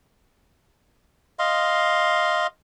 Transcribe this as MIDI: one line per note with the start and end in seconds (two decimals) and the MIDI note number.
1.39 2.47 75
1.39 2.47 77
1.39 2.47 84